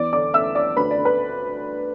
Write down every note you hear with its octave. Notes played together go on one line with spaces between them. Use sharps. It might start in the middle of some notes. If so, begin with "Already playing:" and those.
Already playing: E2 D5 D6
D3 D5 D6
A3 E5 E6
D4 D5 D6
D2 B4 B5
D5
D3
B4